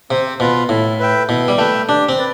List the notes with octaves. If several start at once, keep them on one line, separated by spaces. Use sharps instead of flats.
C3 C4
B2 F4 B4
A2 E4
B4 E5 G5
B2 E4
G3
A3 B4 E5 G5
D4 G4
C4
B4 D5